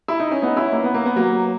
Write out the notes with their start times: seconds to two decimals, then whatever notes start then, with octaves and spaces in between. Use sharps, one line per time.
0.08 E4
0.20 D#4
0.31 C#4
0.42 B3 D#4
0.56 C#4 E4
0.72 A#3
0.84 B3
0.94 A#3
1.05 B3
1.16 F#3 A#3